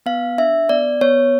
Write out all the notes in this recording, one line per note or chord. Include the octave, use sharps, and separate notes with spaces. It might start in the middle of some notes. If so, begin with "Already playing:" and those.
B3 F5
D4 E5
B3 D5
B3 C#5